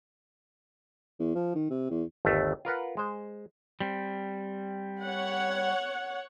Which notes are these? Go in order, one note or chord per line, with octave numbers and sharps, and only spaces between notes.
E2
F3
D#3
C3
E2
G1 D#2 A3
F4 A#4 B4 F#5
G#3 C5
G3 C4
C#5 F#5